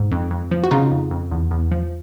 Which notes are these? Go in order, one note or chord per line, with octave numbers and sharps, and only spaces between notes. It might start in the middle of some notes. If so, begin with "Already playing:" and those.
Already playing: G#2
F2
F2
F3
F#4
C#3 D#4 F4
F2
F2
E2
E2
F3